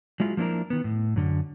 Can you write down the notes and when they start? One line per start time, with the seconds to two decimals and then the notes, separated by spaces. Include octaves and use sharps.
0.20 F#3 G#3 E4 F4
0.37 F3 A#3 D4 E4 A#4
0.70 D#3 B3
0.84 A2
1.16 F#2 D3